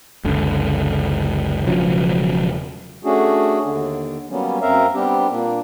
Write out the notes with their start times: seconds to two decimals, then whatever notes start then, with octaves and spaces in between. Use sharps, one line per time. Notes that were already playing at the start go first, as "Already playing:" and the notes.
0.25 F#1 C#2 D3
1.65 E1 C#3 F3 F#3
3.04 A3 C#4 D4 F#4 G#4
3.65 D#2 D3
4.30 F#3 G3 A#3 B3 C#4
4.62 F#2 C4 A#4 E5 F5 A#5
4.95 G3 B3 C4 D4 G4
5.31 A#2 A#3 D4